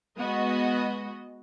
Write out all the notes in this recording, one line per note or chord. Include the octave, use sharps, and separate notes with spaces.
G#3 B3 F#4 D#5